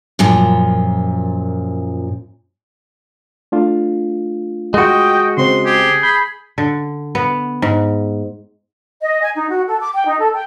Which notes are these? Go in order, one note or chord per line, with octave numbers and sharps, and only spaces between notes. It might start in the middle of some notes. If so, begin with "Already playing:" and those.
F#2 A#2 F3
A3 D4 F4
G#3 F#4 D#5 G5
C#3 C4 C5 C6
G4 G#4
B5 G6
D3
B3
G#2
D#5
G#5
D#4
F#4
A4
D6
G5
D#4
A4
G5